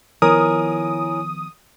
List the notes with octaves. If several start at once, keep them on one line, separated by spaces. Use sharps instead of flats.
D#3 F3 B3 E4 A#4 C#5 G#5 D#6